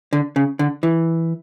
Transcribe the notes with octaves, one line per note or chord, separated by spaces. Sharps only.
D3
C#3
D3
E3